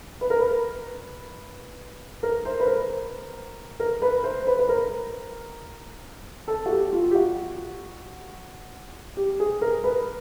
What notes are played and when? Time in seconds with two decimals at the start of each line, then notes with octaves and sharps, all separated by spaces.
0.21 B4
0.30 A#4
0.40 B4
2.23 A#4
2.45 C5
2.60 B4
2.67 A#4
3.80 A#4
4.02 B4
4.24 C5
4.47 B4
4.59 B4
4.69 A#4
6.48 A4
6.66 F#4
6.71 G4
6.93 F4
7.11 G4
7.15 F#4
9.17 G4
9.40 G#4
9.61 A#4
9.84 B4